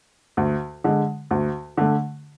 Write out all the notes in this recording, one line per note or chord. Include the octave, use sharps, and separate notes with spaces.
D2
D3 G#3
D2
D3 A3